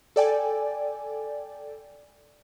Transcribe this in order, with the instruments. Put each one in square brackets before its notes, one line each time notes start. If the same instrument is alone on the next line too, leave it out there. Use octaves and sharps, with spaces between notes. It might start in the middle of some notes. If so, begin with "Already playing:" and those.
[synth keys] A4 D5 G5 G#5